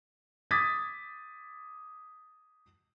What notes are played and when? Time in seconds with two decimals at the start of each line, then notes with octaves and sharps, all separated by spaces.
0.51 D6 D#6 G#6 A6 B6